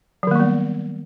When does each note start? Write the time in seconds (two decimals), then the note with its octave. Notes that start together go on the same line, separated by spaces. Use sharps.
0.23 F#3
0.27 D#3
0.31 A#3
0.35 G3
0.40 B3